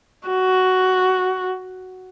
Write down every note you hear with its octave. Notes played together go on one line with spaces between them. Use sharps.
F#4